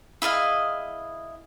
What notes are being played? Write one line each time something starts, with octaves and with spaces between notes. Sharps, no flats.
E4 G#4 D#5 F5